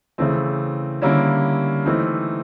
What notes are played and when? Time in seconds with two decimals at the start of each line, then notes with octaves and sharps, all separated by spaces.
0.18 C#3 E3 A3 C4
1.02 D3 G3 A#3 C#4 E4
1.85 E3 A3 C4 D#4